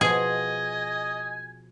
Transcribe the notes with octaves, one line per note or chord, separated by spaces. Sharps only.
B2 F3 G#4 D#5 G#5